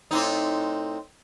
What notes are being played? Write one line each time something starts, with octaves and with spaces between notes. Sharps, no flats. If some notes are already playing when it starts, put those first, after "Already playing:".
A2 C4 D#4